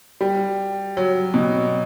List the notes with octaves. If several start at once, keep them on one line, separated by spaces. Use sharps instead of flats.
G3
F#3
B2